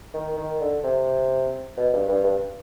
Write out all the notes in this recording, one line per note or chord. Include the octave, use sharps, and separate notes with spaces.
D#3
D#3
D3
C3
B2
G2
G2
G2